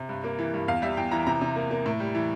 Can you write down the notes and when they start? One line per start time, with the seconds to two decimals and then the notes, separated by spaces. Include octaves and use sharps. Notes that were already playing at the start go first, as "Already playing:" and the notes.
Already playing: C3
0.09 G2
0.24 A#3
0.39 E3
0.54 G2
0.68 E2 F5
0.82 G3 E5
0.97 E2 G5
1.11 E3 A#5
1.27 C3 A#5
1.41 C3
1.56 A#3
1.71 A#3
1.86 A2
2.00 G3
2.15 E3